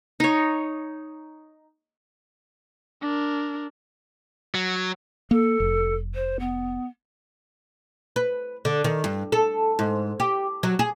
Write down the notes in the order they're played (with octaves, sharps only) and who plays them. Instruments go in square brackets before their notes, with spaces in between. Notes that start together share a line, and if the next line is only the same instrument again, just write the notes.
[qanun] D#4 C#5
[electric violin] D4 A#4
[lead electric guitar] F#3
[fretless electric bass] A#3 [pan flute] A4
[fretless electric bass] F1
[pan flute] C5
B3
[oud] B4
D3
D#3
G2
A4
G#2
G4
F#3
G#4